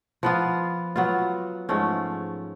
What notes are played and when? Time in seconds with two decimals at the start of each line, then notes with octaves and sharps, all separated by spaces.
0.23 F3 B3 F4
0.96 F#3 B3 F4
1.69 G#2 F3 A3 C#4